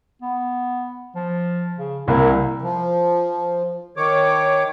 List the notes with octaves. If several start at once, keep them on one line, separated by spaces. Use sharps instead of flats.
B3
F3
C#3
C2 A#3 E4
F3
D#3 C#5 D6